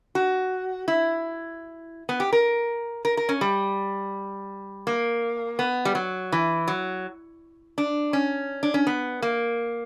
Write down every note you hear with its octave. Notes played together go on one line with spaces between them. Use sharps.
F#4
E4
B3
G4
A#4
A#4
A#4
C#4
G3
A#3
B3
G3
F#3
E3
F#3
D4
C#4
D4
C#4
B3
A#3